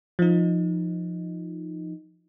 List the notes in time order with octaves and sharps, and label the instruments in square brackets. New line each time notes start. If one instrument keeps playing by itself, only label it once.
[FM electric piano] F3 D#4